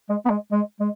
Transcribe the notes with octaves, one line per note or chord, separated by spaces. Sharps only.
G#3
B3
G#3
G#3
G#3